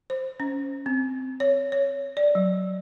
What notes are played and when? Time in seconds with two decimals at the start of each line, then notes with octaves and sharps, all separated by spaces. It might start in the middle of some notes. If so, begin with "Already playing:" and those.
0.10 C5
0.40 C#4
0.86 C4
1.40 C#5
1.72 C#5
2.17 D5
2.35 F#3